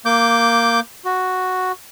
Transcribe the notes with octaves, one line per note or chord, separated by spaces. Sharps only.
A#3 D6 G6
F#4